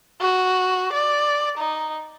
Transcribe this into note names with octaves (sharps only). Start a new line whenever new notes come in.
F#4
D5
D#4